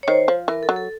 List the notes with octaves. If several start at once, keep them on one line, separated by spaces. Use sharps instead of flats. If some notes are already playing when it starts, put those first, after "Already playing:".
C#5
D#3 C5
F3
E3 A#4
A4
F#3
A4